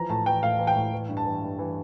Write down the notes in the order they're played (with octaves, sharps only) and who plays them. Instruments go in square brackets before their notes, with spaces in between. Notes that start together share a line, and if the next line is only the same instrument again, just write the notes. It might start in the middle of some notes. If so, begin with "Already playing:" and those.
Already playing: [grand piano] E3 F3 A#5
A2 A5
E3 G5
A2 F5
E3
G5
A2
E3
G2
A5
E3
G2
E3